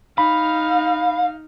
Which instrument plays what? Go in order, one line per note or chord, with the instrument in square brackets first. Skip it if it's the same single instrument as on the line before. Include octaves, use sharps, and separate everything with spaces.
[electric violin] D#4 F6 [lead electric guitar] F5 [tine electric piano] B5